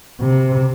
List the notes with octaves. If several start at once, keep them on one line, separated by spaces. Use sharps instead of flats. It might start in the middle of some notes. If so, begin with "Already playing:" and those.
C3